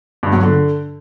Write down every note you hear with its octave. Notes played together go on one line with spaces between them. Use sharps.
G2
F#3
D3